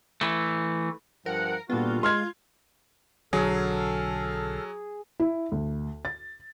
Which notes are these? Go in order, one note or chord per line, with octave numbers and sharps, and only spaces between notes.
E3 A3
G2 F3 A#4 F#5
A#2 D3 G3 A#3 B3 F4 F#4
G#3 F4 C6 F6 G#6
B1 D3 F#3 G#4 A4 F6
E4
D2
A6